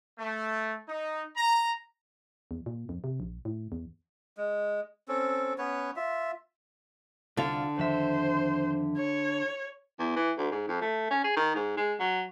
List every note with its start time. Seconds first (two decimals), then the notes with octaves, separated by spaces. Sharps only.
0.19 A3
0.88 D#4
1.37 A#5
2.51 E2
2.66 A#2
2.89 F2
3.04 C3
3.20 A#1
3.45 A2
3.72 E2
4.37 G#3
5.08 C4 C#4 A4
5.58 B3 C#4 B4 C#5
5.96 F4 E5
7.37 C2 D3 F4 F5
7.79 F2 D#3 C5 E5
8.98 C#5
9.99 E2
10.16 E3
10.38 D2
10.51 G#2
10.68 F2
10.81 A3
11.10 C#4
11.24 G#4
11.37 D#3
11.56 G#2
11.77 G#3
12.00 F#3